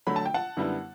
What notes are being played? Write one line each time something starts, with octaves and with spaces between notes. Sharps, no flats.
D3 F#3 A3 B5
A5
G5
F#5 A5
F#2 D3 G3 B3 E4